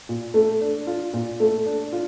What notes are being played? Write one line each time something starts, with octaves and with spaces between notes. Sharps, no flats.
A#2
A3
D4
F4
A#2
A3
D4
F4